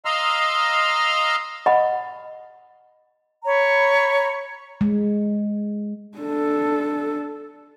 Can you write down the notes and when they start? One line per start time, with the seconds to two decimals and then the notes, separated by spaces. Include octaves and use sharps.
0.05 D#5 F5 A#5 C6 E6 F6
1.66 D#5 F#5 B5
3.45 C#5 A#5 B5
4.81 G#3
6.18 D4 A4